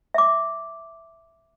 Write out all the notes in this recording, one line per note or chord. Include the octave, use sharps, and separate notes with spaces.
E5 D6